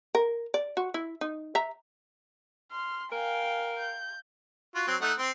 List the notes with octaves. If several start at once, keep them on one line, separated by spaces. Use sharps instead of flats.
A#4
D5
F#4
E4
D#4
E5 A#5
C6 F6
A#4 F5 G5 G#5
G6
F4 F#4
F#3 C4
A3 D#4 F#5
C4